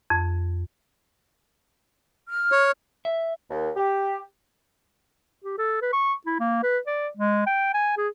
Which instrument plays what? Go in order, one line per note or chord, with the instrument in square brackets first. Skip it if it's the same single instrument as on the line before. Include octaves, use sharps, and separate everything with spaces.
[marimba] F2
[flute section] F6
[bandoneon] C#5
[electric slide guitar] E5
[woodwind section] D#2
G4
[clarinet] G4
A4
B4
C#6
E4
A#3
B4
D5
G#3
G5
G#5
G#4